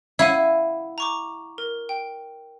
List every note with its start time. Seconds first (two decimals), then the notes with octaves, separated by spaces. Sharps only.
0.19 E4 F5 F#5 D#7
0.98 A#5 C#6 D6
1.58 A#4
1.89 G5